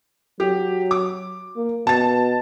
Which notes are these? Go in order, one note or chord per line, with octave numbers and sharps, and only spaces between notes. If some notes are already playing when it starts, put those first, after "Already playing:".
F#3 G4
D6
A#3
B2 A5 A6